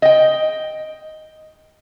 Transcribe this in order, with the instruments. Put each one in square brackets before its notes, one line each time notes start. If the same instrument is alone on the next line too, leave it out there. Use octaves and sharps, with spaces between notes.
[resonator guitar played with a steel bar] D#5 G5